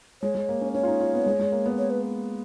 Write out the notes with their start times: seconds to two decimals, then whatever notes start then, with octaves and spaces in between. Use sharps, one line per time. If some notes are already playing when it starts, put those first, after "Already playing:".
0.22 G#3 C#5
0.35 G#3
0.49 A#3
0.61 C#4
0.74 C#4 C#5
0.83 F4
0.87 D#4
1.00 F4
1.14 B3
1.26 G#3
1.39 G#3
1.52 A#3
1.66 B3
1.78 C#5
1.90 B4